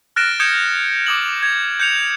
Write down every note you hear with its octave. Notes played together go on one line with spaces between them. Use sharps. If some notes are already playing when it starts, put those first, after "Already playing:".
F6 F#6 A6 A#6 D7 E7
D#6 G6 G#6 C#7 E7
D6 D#6 F#7
G#6
G6 C#7 F7